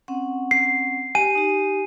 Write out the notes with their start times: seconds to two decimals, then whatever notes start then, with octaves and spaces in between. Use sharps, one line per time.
0.08 C4 C#4 F#5
0.51 C7
1.15 G4 G#5 D#7
1.35 D#4 G4